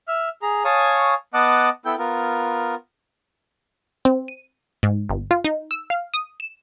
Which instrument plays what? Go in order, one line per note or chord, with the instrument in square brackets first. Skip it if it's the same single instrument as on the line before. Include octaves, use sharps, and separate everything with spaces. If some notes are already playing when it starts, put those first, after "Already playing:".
[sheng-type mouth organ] E5 F6
G#4 A#5
C#5 F5 G#5 A5 C#6 D#6
B3 D#5 F#5 A5 D6 F#6
B3 E4 A4 G5 G6
B3 F4 A#4
[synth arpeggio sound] C4
D#7
G#2
G1
F4
D#4
E6
F5
D#6
E7